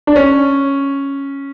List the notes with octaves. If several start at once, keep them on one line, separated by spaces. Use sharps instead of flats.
D4
C#4